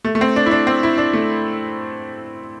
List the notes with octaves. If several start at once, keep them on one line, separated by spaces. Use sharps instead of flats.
A3
A3
C4
D4
E4
D4
C4
E4
D4
A3